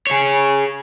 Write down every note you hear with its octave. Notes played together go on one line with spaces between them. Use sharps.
G#4 C#5